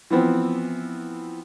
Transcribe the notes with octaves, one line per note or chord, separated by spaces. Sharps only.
E3 F3 B3 C4